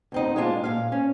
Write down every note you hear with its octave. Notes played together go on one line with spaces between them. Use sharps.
D2 C4 D#4
G#3 A#3 D4 F4 A5
A#2 F5
C#4